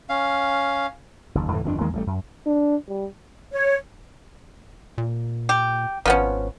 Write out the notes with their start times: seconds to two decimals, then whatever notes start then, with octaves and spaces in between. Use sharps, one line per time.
0.09 C#4 F5
1.35 F#1 D#2
1.52 F2 A2 D3 E3
1.64 G1 F2 D#3 D4
1.81 E2 D#3 G#3 A#3
1.93 A1 G2 G3 A3
2.07 F#2
2.46 D4
2.89 G3
3.52 C#5
4.98 A#2
5.49 G4
6.06 G#1 F3 B3 C#4